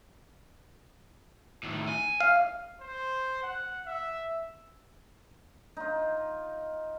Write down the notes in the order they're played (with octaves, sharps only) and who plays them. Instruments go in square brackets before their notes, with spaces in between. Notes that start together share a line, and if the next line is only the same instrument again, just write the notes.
[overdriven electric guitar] A2 D#3
G#5
[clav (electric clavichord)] F5
[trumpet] C5
F#5
E5
[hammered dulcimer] D#4 F4